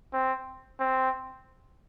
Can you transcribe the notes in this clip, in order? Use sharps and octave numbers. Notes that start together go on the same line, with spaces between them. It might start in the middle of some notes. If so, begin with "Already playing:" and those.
C4
C4